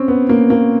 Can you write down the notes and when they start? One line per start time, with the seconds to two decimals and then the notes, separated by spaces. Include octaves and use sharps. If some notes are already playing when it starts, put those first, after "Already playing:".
Already playing: C4 C#4
0.08 B3
0.29 A#3
0.50 A#3